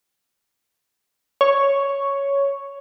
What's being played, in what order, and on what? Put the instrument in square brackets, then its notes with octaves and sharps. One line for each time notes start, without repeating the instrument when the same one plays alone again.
[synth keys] C#5